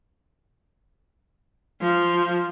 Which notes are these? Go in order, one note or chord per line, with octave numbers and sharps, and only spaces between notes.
F3